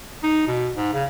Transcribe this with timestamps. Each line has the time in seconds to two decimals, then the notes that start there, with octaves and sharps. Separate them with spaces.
0.23 D#4
0.47 B2
0.76 G#2
0.93 C#3